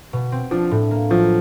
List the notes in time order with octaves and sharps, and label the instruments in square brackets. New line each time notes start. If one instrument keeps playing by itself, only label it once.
[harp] B2
C4
[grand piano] F3 [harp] D4
[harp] A2
A#3
[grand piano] F3 [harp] F#3